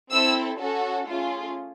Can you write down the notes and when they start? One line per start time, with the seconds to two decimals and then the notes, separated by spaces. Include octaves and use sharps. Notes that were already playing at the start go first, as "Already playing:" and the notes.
0.11 C4 E4 A4 E6
0.59 C#4 F#4 A4
1.07 A3 C#4 F4 G#4